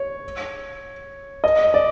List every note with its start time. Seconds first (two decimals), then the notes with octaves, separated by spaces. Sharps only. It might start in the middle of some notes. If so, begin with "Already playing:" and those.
Already playing: C#5
1.44 D#5
1.74 D5